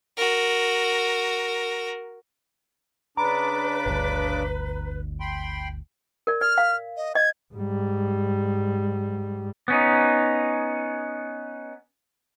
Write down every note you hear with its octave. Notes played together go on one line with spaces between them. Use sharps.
F#4 A#4
C#3 D4 B4 A#5 B5 D6
G1 D2
G5 B5 C6
A#4 D5
D5 F6
F5
D#5
D#5 G#6
G#2 G3
B3 C#4 D#4